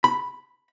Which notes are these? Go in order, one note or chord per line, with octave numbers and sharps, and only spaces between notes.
B5